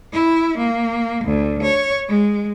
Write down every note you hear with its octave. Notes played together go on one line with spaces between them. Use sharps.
E4
A#3
D2
C#5
G#3